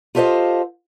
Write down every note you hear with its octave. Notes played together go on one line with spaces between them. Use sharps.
F4 G4 A4 C5 D#5 F5